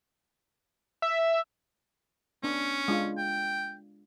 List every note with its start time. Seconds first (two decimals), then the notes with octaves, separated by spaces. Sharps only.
1.02 E5
2.43 B3 C#4 D4
2.88 G#3 D4 F4
3.17 G5